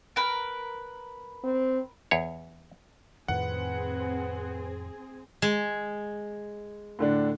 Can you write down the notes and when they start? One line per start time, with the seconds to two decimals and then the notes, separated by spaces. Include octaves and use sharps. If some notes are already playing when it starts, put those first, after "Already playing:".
0.16 A#4 B4
1.44 C4
2.11 E2 C#5
3.28 F2 A2 D#3 C4 G#4 B4 F#5
5.42 G#3
6.99 A2 D3 D4